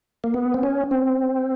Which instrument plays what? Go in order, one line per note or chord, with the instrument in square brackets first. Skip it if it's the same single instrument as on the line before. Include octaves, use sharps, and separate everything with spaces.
[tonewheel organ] A#3
B3
C4
C#4
C4